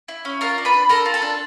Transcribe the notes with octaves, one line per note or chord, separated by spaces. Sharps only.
E4
C#4
F4 A#4 A#5
D4
B4 B5
D4
A4 A#4 A#5
F4
A4 A5
D4